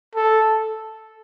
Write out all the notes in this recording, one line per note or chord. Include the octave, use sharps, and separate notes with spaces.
A4